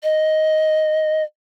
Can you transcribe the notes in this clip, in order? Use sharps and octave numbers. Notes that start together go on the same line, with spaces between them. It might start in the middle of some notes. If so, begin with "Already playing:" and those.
D#5